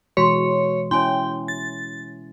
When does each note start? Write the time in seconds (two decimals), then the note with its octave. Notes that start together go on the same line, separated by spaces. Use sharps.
0.17 B2 E3 G#3 F#4 C#5 C6
0.91 C#4 E4 C#5 G5 G#5 C6
1.48 A6